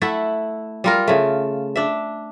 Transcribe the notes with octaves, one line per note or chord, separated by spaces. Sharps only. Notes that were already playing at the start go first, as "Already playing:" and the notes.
A3 E4 A4 F#5
G3 F4 A#4
C#3 A3
D4 E5